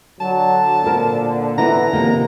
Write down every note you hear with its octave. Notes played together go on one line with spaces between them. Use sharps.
D3 F#3 A5
A#2 C4 A#4
E3 B3 E4 A#5
C3 D#3 F3 A#3